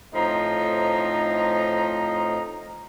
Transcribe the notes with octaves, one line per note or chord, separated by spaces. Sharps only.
A2 F3 C4 D#4 A#5